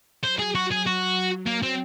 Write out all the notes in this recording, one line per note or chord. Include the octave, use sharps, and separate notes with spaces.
F#3 C5
G#4
F#4
G#4
F#4
A#3
C4